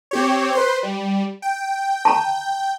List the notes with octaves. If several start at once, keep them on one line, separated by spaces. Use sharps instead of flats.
C4 G4 C#5
B4 C5 C6
G3
G5
A5 A#5